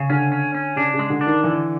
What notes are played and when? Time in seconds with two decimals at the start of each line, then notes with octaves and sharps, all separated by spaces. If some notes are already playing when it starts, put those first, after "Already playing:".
Already playing: C#3
0.10 D3 C#4
0.32 C#4
0.55 C#4
0.76 C#3 D4
0.94 C#3
0.99 G#3
1.10 D3
1.21 D4
1.27 D#3
1.43 D3 E3